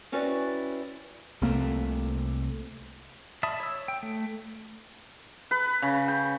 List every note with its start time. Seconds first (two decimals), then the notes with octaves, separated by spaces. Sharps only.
0.12 C4 C#4 E4 F#4 B4 D5
1.42 C2 C3 A3 A#3
3.43 D5 E5 A5 B5 D#6
3.60 C#5 E6
3.88 G5
4.03 A3
5.51 B4
5.82 C#3
6.08 G5